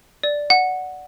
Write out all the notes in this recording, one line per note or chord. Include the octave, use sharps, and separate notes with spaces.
D5
F#5